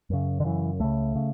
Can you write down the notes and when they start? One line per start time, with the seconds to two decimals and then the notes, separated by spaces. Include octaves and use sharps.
0.10 F#2 C#3
0.40 D3
0.44 F#2 C#3 E3
0.80 C#2 C#3 A3
1.16 C#3